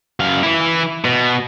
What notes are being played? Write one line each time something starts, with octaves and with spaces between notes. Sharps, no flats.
F#2 F5
E3 E4
B2